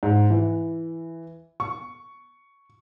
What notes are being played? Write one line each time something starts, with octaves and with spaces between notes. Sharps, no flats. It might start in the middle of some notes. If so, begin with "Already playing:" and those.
G#2
E3
C#6